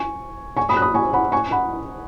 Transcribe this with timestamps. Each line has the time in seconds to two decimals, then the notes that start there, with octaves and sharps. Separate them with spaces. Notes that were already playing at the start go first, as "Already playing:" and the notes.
Already playing: G#5 C#6
0.57 G#5 C#6
0.69 B5 D#6
0.77 F#6
0.82 B5 D#6
0.94 G#5 C#6
1.13 F#5 B5
1.32 G#5 C#6
1.51 F#5 B5